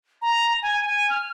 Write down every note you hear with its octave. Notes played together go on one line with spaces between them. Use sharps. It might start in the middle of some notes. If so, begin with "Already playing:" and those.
A#5
G#5
G#5
F6